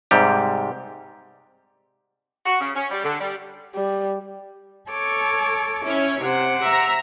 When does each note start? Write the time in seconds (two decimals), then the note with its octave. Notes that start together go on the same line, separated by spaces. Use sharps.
0.11 G#2 C3 G3 G4
2.46 F#4
2.60 C#3
2.75 C#4
2.91 G3
3.04 D3
3.20 G3
3.75 G3
4.90 A4 C#5 D6
5.85 C#4 E4 C#5
6.22 C3 C5 F#5 D6
6.64 E5 A#5